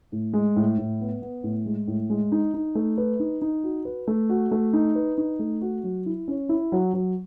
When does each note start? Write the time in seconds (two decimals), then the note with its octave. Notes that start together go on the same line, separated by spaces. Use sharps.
0.12 A2
0.33 G#3
0.56 A2
0.78 A2
1.01 B3
1.22 B3
1.43 A2
1.66 G#3
1.88 A2
2.10 G#3
2.32 D#4
2.54 D#4
2.75 A3
2.98 B4
3.20 D#4
3.42 D#4
3.64 F#4
3.85 B4
4.08 A3
4.29 F#4
4.51 A3
4.73 D#4
4.95 B4
5.18 D#4
5.39 A3
5.61 F#4
5.84 F#3
6.06 E4
6.28 C#4
6.49 E4
6.72 F#3
6.94 F#3